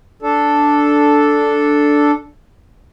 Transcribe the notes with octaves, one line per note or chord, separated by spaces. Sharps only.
D4 A4